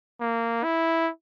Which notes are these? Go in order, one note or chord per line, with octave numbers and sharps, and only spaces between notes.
A#3
E4